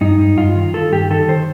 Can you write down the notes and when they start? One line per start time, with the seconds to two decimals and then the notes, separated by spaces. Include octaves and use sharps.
0.01 G2 D#4
0.19 G2
0.37 G2 F4
0.56 D#3
0.74 D#3 A4
0.92 G2 G4
1.10 D#3 A4
1.28 D#3 C5